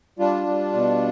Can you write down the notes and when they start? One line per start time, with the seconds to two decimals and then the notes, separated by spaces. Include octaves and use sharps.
0.19 G3 D4 F4
0.47 G3
0.74 B2